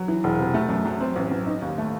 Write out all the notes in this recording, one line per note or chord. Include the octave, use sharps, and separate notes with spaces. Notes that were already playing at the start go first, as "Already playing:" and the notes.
Already playing: F#3
E3
E1
C3
A3
F#2
F#3
C4
A1
F#3
D#4
D#2
A3